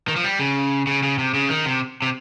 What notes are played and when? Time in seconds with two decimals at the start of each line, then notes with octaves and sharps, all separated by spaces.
0.08 D#3
0.16 F3
0.24 G3
0.39 C#3
0.87 C#3
1.03 C#3
1.19 C3
1.34 C#3
1.50 D#3
1.66 C3
2.02 C3